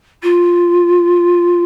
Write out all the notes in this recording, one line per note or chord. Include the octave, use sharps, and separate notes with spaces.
F4